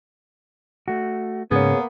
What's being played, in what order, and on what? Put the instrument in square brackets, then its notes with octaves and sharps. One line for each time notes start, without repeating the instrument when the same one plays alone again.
[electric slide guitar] A3 F#4
[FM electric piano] G#2 C#3 [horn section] A#3 B3 [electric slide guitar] G#4 C#5